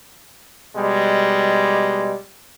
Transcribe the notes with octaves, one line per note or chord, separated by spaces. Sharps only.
B2 G3 G#3